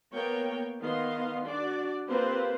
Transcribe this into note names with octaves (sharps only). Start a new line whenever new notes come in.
A#3 B3 A#4 C#5 G5
D#3 B3 D#5 F5 C6
D4 F#4 D5
A#3 C4 F4 G4 B4 C5